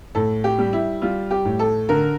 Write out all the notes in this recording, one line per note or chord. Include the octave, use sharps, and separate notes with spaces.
A2 A4
G4
G3
E4
G3 F4
G4
A2
A4
D3 A#4